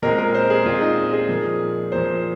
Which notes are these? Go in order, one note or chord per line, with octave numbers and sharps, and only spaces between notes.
A#2 G#3 C4 A#4
A#4
C5
G#4
A#2 G#3 C4 F4
D#4
G#4
A#2 F3 A#3
A#2 F3 A#3 C5